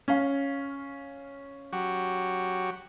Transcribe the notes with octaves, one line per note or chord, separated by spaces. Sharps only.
C#4 F5
F#3 F#4 G4